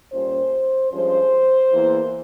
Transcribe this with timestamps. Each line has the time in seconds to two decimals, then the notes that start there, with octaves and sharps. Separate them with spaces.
0.11 A#2 G3 C#4 C5
0.91 G2 F3 G#3 C#4 C5
1.70 E2 E3 A#3